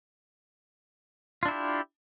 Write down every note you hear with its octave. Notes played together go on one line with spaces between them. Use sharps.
D4 E4 F4 G4